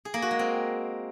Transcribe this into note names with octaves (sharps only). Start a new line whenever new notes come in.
G#4
A#3
F#4
G#3
C4